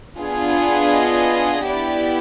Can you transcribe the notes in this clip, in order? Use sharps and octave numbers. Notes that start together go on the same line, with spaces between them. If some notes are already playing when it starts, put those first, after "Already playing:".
B3 D4 F4 G#4
D#5
B3 E4 G4 D5